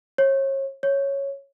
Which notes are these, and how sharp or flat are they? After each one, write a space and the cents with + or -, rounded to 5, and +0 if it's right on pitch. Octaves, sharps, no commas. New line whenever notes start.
C#5 -35
C#5 -5